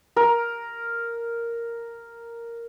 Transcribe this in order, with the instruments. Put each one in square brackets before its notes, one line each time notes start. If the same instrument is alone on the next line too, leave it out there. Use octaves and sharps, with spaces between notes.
[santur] A#4